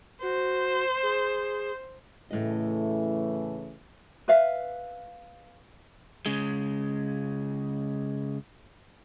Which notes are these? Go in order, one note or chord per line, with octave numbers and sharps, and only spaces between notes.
F#4 C5
G#4
A2 C#3 E3 A3 D#5
B4 E5 F5
C#3 G#3